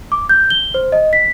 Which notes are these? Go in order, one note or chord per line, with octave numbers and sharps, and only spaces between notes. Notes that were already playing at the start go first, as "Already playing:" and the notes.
D6
G6
G7
C5
D#5
B6